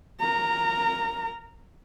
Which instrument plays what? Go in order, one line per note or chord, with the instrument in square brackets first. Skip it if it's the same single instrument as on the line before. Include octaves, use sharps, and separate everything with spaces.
[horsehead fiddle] A#4 A#5